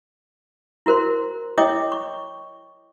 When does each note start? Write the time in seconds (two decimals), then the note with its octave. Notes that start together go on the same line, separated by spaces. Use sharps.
0.86 E4 F#4 A#4 C5 C6
1.58 E4 C#5 D#5 G5 D6 D#6
1.92 C#6